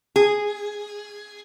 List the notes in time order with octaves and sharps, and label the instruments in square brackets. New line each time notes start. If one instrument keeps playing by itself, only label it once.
[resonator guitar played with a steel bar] G#4